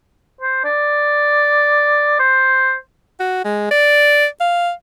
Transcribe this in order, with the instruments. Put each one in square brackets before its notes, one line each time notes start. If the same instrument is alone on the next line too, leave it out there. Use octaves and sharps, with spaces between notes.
[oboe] C5
D5
C5
[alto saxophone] F#4
G#3
D5
F5